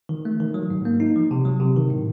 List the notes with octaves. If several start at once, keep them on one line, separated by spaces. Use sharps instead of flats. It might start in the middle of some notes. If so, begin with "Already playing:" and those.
D#3
A3
D#3
F#3
G#2
A#3
D#4
F3
C3
F#3
C3
D#3
A2